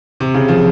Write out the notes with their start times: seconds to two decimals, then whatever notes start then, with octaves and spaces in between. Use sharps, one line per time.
0.20 C3
0.34 C#3
0.48 F3